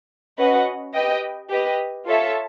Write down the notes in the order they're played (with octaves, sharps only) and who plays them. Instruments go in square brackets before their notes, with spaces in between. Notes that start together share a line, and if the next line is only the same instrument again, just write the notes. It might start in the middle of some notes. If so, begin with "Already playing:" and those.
[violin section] C#4 F#4 B4 D#5 F#5
G4 B4 D#5 G5
G4 B4 D#5
F4 A4 C#5 E5 A5